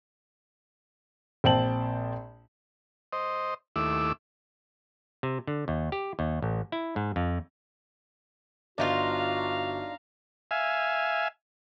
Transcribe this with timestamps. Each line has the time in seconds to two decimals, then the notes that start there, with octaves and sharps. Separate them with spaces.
1.44 A#1 C4 G5 A5 F#7
3.13 C5 D#5
3.76 D#2 A3 E4 D6 E6
5.23 C3
5.47 D3
5.68 D#2
5.92 G4
6.19 D#2
6.42 A1
6.72 E4
6.96 G#2
7.16 F2
8.78 G1 D4 D#4 F4 F#4 F5 A#5
10.51 E5 F5 G#5